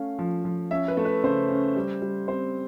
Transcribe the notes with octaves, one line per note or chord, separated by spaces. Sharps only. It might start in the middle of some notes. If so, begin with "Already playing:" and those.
Already playing: A3 C#4 F5
F3
F3
C#4 E5
B4
A3
B4
C#3 C5
C#4
G3
G3
C4 C5